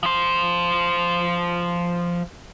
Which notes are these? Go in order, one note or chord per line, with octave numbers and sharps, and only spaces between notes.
F3 C5